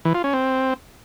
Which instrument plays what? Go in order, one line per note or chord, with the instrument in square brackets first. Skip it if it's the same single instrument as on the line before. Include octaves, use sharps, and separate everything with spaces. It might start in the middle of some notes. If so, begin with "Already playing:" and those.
[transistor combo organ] E3
F4
C#4
C4